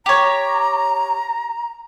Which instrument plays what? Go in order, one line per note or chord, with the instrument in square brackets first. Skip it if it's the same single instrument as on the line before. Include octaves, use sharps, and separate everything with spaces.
[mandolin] G4 C#5 [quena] A#5